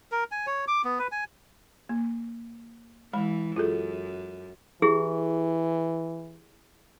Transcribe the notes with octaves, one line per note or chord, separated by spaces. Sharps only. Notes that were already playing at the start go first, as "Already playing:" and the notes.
A#4
G#5
C#5
D6
B3
B4
G#5
A#3
E3 G#3 B5
F#2 F4 G#4 A4
E3 E4 G4 G#4